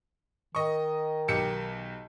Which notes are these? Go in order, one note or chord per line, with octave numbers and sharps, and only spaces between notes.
D#3 D#5 C#6
B1 G4 C#7